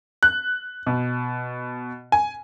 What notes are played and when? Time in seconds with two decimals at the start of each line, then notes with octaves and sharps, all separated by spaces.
0.23 F#6
0.87 B2
2.12 G#5